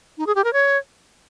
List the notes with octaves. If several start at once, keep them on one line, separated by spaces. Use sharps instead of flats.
D#4
G#4
G4
A#4
C#5